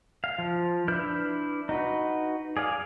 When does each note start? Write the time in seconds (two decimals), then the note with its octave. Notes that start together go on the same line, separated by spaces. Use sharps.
0.24 F5
0.39 F3
0.88 D4 E4 B4 F6 G6
1.69 D#4 F#4 B4
2.57 G#4 D5 F5